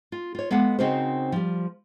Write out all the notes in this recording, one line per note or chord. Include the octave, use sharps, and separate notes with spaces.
F4
F4 C#5
G#3 B3 A4 F5 F#5
C#3 C4 D#4 F#4 A#4 C5
F3 G3